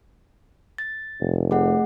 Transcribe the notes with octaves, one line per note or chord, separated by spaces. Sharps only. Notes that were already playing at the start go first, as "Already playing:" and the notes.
A6
F1
A3 G#4 F#5